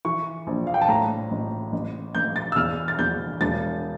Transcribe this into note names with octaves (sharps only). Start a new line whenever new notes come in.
E3 C#6
A#1
F5
G5
A5
A2 A#5
A1
A1
A1 G6
A6
E6
E2 F6
A6
E2 G6
E1 A6